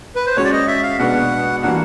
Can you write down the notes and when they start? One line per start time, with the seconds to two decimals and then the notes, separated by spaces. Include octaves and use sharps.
0.16 B4
0.26 C5
0.36 G#3 C#4 F#4 C#5
0.45 D5
0.52 D#5
0.68 E5
0.83 F5
0.99 B2 G#3 B3 D4 F#5
1.63 E3 G3 A#3 D4 F#4 F#5